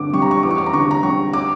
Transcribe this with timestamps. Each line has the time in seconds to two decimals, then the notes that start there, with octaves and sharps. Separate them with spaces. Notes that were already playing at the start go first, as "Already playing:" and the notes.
Already playing: G2 D3 D6
0.14 G3 C#6
0.22 A#5
0.31 C#6
0.43 E2 D6
0.51 C#6
0.58 D6
0.66 A#5
0.73 D3 C#6
0.91 A#5
1.03 G3 C#6
1.33 D6